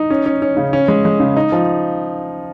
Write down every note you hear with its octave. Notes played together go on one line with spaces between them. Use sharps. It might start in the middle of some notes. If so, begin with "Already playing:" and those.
Already playing: D#4
C#4
C#4
C#4
C#3
C#4
G#3
G#3
C#3
D#4
F3